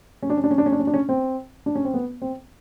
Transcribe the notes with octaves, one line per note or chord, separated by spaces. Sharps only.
C#4
D4
C#4
D4
C#4
D4
C#4
D4
C#4
D4
C#4
C4
D4
C#4
C4
B3
C4